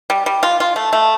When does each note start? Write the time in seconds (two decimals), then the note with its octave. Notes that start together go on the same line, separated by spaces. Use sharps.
0.10 G3
0.26 G3
0.43 F4
0.60 F4
0.76 A3
0.93 A3